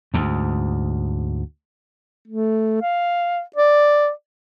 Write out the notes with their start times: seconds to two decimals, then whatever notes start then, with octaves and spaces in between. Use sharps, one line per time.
0.14 D2 G#2
2.28 A3
2.82 F5
3.56 D5